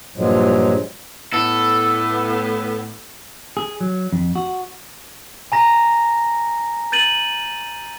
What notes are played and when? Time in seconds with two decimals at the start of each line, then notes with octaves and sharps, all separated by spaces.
0.16 G2 A#2 F3 F#3 G#3
1.33 A2 B3 A4
3.57 G#4
3.81 F#3
4.13 F2
4.35 F#4
5.52 G#5 A#5 A#6
6.92 G6 A6 D#7 F#7